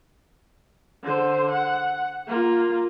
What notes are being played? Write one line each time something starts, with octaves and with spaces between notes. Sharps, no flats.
D3 C5
F#5
A#3 F4